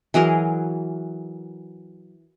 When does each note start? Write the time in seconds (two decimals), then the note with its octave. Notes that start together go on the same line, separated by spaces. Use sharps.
0.14 E3 F#3 G#4 A#4